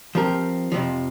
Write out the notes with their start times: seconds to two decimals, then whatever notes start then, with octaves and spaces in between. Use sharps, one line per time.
0.15 F3 C4 G4 A#4
0.72 F2 C3 F3